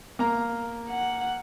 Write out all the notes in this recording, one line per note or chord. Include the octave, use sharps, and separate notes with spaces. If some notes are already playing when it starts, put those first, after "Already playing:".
A#3 A#5
F#5